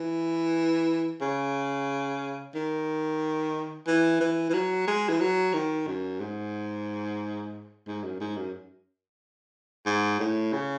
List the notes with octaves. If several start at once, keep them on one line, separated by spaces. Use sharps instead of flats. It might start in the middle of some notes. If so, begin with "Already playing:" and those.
Already playing: E3
C#3
D#3
E3
E3
E3
F#3
G#3
E3
F#3
D#3
F#2
G#2
G#2
F#2
G#2
F#2
G#2
A2
C#3